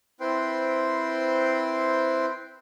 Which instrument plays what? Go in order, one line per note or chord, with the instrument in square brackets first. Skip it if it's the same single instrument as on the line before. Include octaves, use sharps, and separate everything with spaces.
[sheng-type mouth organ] C4 E4 B4 C5 G5 C6